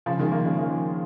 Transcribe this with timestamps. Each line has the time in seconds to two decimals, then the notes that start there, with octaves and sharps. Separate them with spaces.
0.06 C#3 F3
0.19 D#3 G#3
0.32 F3 A#3
0.45 G#3 C#4
0.58 F3 A#3